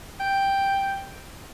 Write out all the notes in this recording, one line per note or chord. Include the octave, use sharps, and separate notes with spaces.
G5